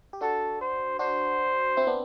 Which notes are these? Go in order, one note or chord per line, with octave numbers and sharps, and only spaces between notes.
G4
D4 F#4 A4
C5
D4 F#4 C5
C4 E4
B3 D4